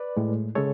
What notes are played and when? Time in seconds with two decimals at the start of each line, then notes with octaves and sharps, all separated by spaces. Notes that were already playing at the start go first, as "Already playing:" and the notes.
Already playing: B4 D5
0.17 A2 G#3
0.55 C#3 G#3 A4 C#5